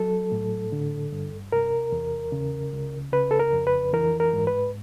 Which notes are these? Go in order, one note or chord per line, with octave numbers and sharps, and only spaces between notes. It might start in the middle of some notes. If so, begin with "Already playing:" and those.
Already playing: F#3 A4
A2
D3
G2
C3 A#4
E2
C#3
C#2
C#3 B4
A4
A#4
F2
B4
E3 A#4
A#4
G#2
B4